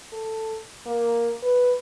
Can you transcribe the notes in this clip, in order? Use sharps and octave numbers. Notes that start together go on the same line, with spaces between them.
A4
A#3
B4